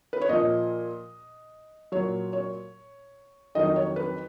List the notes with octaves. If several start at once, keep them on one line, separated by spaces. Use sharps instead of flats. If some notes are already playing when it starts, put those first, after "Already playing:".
B4
C#5
A#2 F3 D#5
A#2 F#3 C#5
C#5
F2 D#3 F#3 D#5
C#5
B4